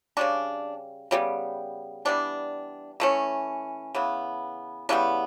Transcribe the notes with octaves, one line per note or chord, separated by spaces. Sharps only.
C#3 G3 C#4 D4
C#3 G3 B3
E3 G3 B3 D4
E3 A3 C#4
C#3 E3 B3
C#3 E3 G3 B3 D4